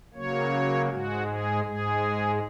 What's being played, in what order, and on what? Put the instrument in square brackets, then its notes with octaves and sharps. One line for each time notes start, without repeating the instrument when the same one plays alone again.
[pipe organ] C#3 F#3 A#3 C#5
G#2 G#3 F#4
G#4
G#2 G#3 G#4